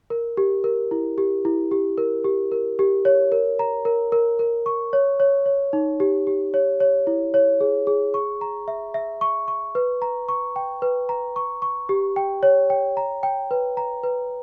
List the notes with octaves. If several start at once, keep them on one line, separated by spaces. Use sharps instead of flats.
A#4
G4
A#4
E4
G4
E4
G4
A#4
G4
A#4
G4
C#5
A#4
A#5
A#4
A#4
A#4
C#6
C#5
C#5
C#5
D#4
G4
G4
C#5
C#5
E4
C#5
G#4
G#4
C#6
A#5
E5
E5
C#6
C#6
B4
A#5
C#6
G5
B4
A#5
C#6
C#6
G4
G5
C#5
G5
A#5
G5
B4
A#5
B4